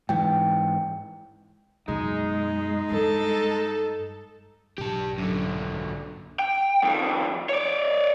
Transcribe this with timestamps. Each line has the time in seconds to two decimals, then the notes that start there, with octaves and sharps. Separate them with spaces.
0.09 G#2 E3 G5
1.88 F#2 B2 G#3 D#4
2.91 G2 A4
4.78 B1 G#2 G4 A5
5.18 F#2 D3
6.39 G5
6.83 F2 D#3
7.49 C#5 D5